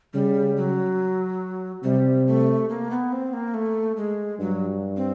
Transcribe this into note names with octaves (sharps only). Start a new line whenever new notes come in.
C#3 G3
F#3
C3 G3
A3
A#3
B3
C4
A#3
A3
G#3
G2 F#3
C4